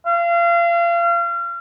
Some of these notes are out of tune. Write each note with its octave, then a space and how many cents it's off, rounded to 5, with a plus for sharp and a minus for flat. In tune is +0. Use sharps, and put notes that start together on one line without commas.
F5 -35